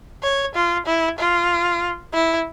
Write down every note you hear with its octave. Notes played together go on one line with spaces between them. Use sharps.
C#5
F4
E4
F4
E4